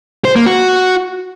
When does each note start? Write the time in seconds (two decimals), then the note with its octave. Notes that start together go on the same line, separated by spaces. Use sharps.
0.25 C5
0.35 A#3
0.46 F#4